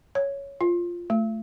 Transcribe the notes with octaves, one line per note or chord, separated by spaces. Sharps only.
C#5
F4
A3